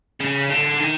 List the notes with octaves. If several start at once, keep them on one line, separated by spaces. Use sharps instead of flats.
C#3
D3
D#3